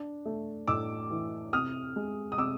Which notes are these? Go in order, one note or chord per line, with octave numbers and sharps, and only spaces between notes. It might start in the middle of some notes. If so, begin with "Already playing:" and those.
Already playing: D4
A3
A2 D6 E6
E3
C3 D#6 F6
G#3
D#6
C3 D6 E6